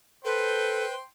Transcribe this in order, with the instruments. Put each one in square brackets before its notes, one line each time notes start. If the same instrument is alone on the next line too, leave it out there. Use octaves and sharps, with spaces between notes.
[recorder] A4 [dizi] B4 [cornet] C5 [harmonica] G5 C6